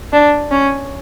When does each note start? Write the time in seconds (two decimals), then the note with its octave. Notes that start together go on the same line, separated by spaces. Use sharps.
0.13 D4
0.51 C#4